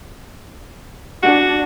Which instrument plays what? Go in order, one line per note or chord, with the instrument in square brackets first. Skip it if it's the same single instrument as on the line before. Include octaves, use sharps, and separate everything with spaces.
[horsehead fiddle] D4 [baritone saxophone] F#4